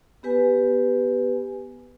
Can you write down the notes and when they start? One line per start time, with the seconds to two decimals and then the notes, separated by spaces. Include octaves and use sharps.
0.23 B3 G4 B4 G#5